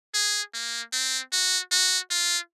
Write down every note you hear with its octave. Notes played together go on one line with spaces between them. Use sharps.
G#4
A#3
C4
F#4
F#4
F4